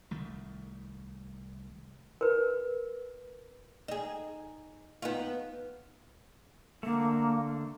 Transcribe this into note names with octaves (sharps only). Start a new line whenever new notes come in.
C2 D#3 A3
A#4 B4
D#4 G#4
B3 D#4 F4
D3 A3 A#3